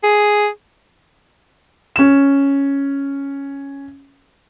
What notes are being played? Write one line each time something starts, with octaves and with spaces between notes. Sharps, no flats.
G#4
C#4 E7